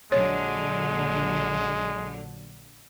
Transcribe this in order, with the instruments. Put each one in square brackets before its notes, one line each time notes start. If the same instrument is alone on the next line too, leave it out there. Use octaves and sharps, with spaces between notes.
[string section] A#1 D3 F#3 [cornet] G#3 [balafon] C#5